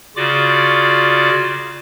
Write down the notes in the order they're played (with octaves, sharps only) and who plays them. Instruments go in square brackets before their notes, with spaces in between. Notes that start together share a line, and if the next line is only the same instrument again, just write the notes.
[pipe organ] C#3 F4 F#4 D5 D6